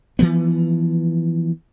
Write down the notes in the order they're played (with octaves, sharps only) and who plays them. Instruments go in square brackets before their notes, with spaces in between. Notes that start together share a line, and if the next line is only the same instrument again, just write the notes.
[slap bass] E3 F3 B3